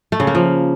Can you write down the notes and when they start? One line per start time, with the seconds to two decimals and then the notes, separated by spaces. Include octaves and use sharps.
0.12 A3
0.20 C#3
0.27 A#3
0.35 F3